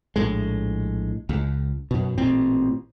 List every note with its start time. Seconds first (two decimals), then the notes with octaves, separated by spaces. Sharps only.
0.16 A#1 A2 G#3
1.29 C#2
1.91 F#2 B2
2.18 A1 A#2 C4